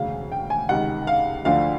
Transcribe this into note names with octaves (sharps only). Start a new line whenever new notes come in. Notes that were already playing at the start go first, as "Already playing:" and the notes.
Already playing: E1 D2 C#3 F5
G5
G#5
C#2 C3 D#3 F#5
F5
D2 D3 F3 F5